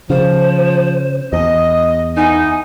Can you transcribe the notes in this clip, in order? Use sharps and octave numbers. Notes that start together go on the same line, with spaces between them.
C#3 F3 C5
E2 D#5
E3 B3 D#4 G#5